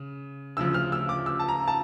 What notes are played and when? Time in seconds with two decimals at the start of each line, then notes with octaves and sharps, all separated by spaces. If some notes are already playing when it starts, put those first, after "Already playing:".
Already playing: C#3
0.57 D2 C#3 F3 E6
0.74 F6
0.92 E6
1.09 D6
1.26 E6
1.39 A5
1.48 A#5
1.67 A5